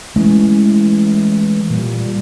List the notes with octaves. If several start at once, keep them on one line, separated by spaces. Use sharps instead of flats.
E3 G#3 A3 C#4
A#2 G3